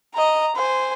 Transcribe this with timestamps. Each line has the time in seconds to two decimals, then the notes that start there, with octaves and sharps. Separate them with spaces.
0.15 D#5 A#5
0.56 C5 G#5